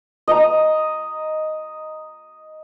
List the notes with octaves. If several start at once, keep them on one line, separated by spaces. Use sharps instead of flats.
D#5 A#5